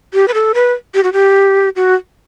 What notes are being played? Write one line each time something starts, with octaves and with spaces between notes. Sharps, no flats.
G4
B4
A4
B4
G4
F#4
G4
F#4